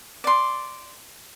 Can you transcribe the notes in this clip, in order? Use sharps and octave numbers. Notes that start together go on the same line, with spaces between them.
D5 C6